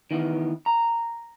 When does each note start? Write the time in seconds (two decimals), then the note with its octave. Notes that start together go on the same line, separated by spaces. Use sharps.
0.11 D#3 E3 B3
0.66 A#5